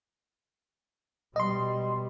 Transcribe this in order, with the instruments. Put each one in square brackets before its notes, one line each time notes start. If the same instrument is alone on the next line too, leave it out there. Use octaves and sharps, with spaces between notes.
[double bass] B2 G3 [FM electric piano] D#5 C6